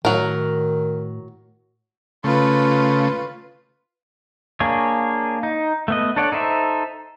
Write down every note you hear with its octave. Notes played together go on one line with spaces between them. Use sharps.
A2 D#3 F#3 A#4
C#3 A3 F4 B4
A#3 D4 G#4 C#5
D#4
A3 B3 D#5
D4 A4 C#5 D5 F#5
D#4 A4 C5 E5